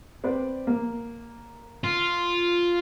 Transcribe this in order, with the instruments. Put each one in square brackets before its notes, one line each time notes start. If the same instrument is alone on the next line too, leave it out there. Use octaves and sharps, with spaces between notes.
[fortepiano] C4 B4 D5
A#3
[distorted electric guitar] F4